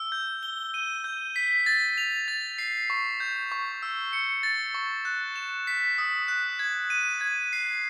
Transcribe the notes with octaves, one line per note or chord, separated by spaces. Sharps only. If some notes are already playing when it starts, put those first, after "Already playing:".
Already playing: E6
G6
G7
D#7
G6
B6
A6
F7
A6
C7
C#6
G6
C#6
E6
C#7
A6
C#6
F#6
E7
B6
D#6
F#6
G#6
D#7
G#6
C7